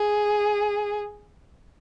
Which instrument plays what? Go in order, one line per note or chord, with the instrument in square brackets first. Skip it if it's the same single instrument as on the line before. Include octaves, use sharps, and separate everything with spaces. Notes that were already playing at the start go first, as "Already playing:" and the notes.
Already playing: [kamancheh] G#4